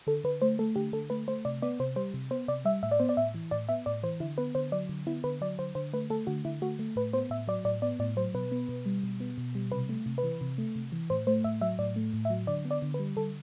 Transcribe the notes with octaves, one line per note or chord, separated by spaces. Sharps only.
D3 A4
D3 B4
A3 C5
A3 A4
D3 G4
D3 A4
A3 B4
A3 C5
C3 D5
B3 D5
C3 C5
G3 C5
C3
B3 C5
C3 D5
G3 E5
A2 E5
D5
B3 C5
D5
A2 E5
E3
A2 D5
B3 E5
A2 D5
E3 C5
D3 E4
B3 B4
D3 C5
F#3 D5
D3
B3 E4
D3 B4
F#3 D5
D3 C5
D3 C5
A3 B4
A3 A4
D3 F#4
D3 E4
A3 F#4
A3
A2 B4
B3 C5
A2 E5
F#3 D5
A2 D5
B3 D5
A2 D5
F#3 C5
B2 B4
B3
B2
G3
B2
B3
B2
G3
C3 B4
A3
C3
B4
E3
C3
A3
C3
E3
A2 C5
A3 C5
A2 E5
F#3 E5
A2 D5
A3
A2
E5
F#3
D3 D5
B3
D5
D3
B4
G3
D3 A4